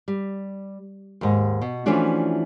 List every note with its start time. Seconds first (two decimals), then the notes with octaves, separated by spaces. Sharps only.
0.08 G3
1.21 D#2 G#2
1.62 B2
1.86 E3 F3 A3 C#4 D4 F#4